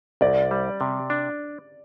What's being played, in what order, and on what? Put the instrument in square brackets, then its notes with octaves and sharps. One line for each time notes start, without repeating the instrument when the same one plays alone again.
[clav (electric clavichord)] C2 [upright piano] D5
[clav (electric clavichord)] G3
C3
D4